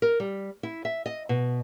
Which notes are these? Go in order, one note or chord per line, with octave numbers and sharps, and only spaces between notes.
A#4
G3
E4
E5
D#5
B2